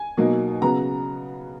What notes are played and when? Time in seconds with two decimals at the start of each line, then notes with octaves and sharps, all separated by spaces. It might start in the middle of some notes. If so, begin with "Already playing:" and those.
Already playing: G#5
0.17 B2 F#3 A#3 D#4
0.62 C#3 F#3 B3 A#5